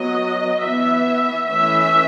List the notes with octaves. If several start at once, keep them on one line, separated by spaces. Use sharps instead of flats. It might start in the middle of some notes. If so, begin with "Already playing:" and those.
Already playing: F#3 B3 D#5
E3 B3 E5
E3 A3 C#4 E5